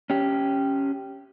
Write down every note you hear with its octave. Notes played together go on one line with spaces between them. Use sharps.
C#4 G4